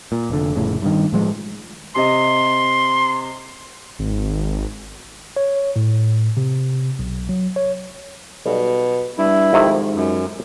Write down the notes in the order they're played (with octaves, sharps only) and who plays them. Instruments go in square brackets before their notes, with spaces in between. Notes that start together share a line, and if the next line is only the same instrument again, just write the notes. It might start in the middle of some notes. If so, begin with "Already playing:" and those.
[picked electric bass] A#2
F1 D3
F1 A2 C#3
G2 D#3
A2 F3 G#3
[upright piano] C3 D#5 [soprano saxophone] C6
[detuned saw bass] G#1
[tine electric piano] C#5
A2
C3
B1
F#3
C#5
[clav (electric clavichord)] B1 G3 [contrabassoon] B2
[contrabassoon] G2 [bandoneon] E4
[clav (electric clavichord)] F2 C3 D#3 [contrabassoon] G#2
[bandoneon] F#2